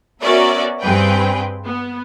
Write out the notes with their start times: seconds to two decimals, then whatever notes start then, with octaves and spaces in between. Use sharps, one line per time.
0.22 B3 C#4 F#4 A#4 D5 E5
0.82 G2 C4 G#4 B4 G5
1.65 B3